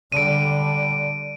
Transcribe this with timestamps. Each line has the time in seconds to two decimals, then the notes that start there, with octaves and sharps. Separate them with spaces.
0.12 D3 G3 D7 D#7